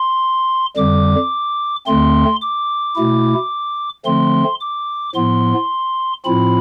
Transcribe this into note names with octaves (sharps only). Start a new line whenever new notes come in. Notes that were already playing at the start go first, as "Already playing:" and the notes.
Already playing: C6
F2 D3 G3 D6
D2 D3 A3 C4 C6
D6
B2 A3 E4
D3 F3 A3 C4 C6
D6
A2 F3 B3 C6
A2 F3 C4 F4 B5